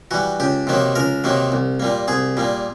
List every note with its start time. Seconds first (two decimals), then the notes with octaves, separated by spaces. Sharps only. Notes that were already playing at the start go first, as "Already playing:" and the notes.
0.11 E3 G3 F#4
0.40 C#2 G4
0.67 C3 D#3 F#3 A#3
0.95 C#2 A#4
1.24 C3 D#3 F#3 A#3
1.52 C2
1.80 A#2 G3 A#3
2.08 C2 G#4
2.37 A#2 G3 A#3